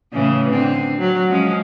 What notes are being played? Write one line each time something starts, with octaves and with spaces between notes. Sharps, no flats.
A2 C#3 E3
D3 C4
F#3
F3 G#3 C#4